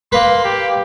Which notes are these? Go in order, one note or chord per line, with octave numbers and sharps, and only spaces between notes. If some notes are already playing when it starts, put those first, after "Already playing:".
A#3 B4 C6
G4